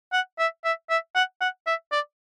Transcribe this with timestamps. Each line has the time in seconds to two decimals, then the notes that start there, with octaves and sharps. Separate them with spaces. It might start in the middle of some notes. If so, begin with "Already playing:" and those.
0.13 F#5
0.39 E5
0.65 E5
0.90 E5
1.15 F#5
1.41 F#5
1.67 E5
1.92 D5